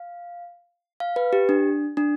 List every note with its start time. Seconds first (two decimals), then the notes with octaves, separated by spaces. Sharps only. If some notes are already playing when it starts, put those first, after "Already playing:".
Already playing: F5
1.00 F5
1.16 B4
1.33 G4
1.49 D4
1.97 D4